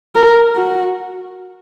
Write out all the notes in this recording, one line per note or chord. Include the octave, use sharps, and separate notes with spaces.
A#4
F#4